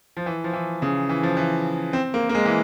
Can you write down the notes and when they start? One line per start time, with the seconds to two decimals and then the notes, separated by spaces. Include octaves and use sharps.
0.17 F3
0.26 E3
0.44 F3
0.53 E3
0.82 C#3
1.09 E3
1.23 F3
1.37 E3
1.93 C4
2.14 A#3
2.29 A#3
2.35 G#3
2.45 E3